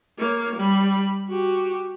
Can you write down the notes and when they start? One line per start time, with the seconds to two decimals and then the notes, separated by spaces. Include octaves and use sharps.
0.18 A#3 C#5
0.56 G3 B5
1.29 F#4 G4